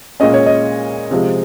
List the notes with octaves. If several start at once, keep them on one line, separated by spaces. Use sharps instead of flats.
A#2 G#3 C#4 D#5
C#5
D#5
C3 F3 G#3